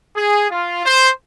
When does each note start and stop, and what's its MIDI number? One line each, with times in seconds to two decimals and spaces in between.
0.16 0.50 68
0.51 0.82 65
0.85 1.10 72